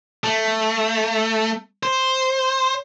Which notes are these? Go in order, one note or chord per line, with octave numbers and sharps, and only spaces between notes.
A3
C5